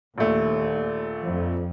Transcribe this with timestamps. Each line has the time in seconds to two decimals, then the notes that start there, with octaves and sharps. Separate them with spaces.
0.18 A#1 D#2 A3
1.23 F2